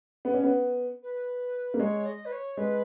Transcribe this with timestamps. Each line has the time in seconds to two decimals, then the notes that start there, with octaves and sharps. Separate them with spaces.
0.25 B3
0.34 C#4
0.44 B3
1.02 B4
1.74 A#3
1.79 G#3 C#5
2.05 D#5
2.25 B4
2.32 C#5
2.57 G#3 B4